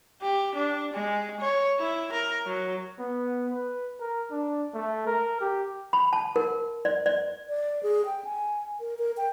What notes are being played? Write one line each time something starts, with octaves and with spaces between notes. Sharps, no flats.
G4
D4
G#3
C#5
E4
A#4
F#3
B3
B4
A#4
D4
A3
A#4
G4
B5
A5
A#4
D5
D5
D5
G#4
G5
G#5
A#4
A#4
G5